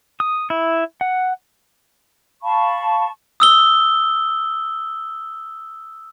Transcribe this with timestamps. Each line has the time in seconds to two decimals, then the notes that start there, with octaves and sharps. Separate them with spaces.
0.20 D#6
0.50 E4
1.01 F#5
2.43 F5 A5 B5 C#6
3.40 D#6 E6 G7